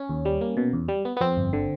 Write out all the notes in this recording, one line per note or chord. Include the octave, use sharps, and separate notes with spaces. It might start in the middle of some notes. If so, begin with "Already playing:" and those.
Already playing: C#4
D#2
G3
A#3
B2
E2
G3
B3
B3
F2 C4
G1
D3